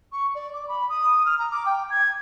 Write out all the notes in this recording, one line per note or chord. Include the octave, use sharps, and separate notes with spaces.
C#6
D5
D6
B5
D#6
F6
A#5
D6
G5
G#6